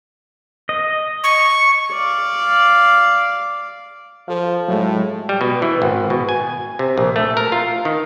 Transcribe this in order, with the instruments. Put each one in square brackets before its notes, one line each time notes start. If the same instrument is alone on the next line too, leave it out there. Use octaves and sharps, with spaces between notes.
[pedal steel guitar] D#5
[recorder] C#6
[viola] D5 F5
[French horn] F3 [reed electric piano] A4 F5
[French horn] A2 [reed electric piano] F#3 G#3
[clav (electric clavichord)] G3
B2
E3
G#1
B2
G#5
C3
A#1
A3
A#4
F4
D#3